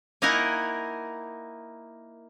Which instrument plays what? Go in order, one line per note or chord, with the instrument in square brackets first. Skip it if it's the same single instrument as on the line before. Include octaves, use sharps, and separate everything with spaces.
[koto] A#3 D#4 E4 A#4 F#5 G#5